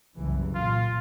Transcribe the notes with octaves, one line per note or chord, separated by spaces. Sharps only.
F#1 C2 E3
A#2 F4